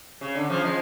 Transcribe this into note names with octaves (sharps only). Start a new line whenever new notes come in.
C#3
D3
C#3 F3
F3 G#3